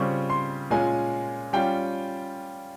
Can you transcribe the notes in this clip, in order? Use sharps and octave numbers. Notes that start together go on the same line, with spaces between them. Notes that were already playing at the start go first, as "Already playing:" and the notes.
Already playing: C#3 G3 C4 F4 C#6
C6
A#2 G#3 C#4 F4 G#5
G3 C#4 F4 G5